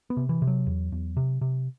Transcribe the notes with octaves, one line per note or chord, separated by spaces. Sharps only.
B3
C3
E3
C3
F#3
E2
E2
C3
C3